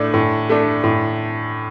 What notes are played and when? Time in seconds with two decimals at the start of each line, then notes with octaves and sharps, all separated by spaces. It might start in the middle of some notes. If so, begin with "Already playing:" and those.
Already playing: A2 A3 D4
0.14 A2
0.50 A3 D4
0.84 A2